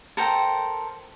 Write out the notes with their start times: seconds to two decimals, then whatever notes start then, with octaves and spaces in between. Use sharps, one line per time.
0.17 A4 A#4 C5 G5